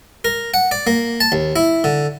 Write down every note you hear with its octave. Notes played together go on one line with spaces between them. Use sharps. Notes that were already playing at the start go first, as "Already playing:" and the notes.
A#4
F#5
D5
A#3
A5
D#2
E4
D3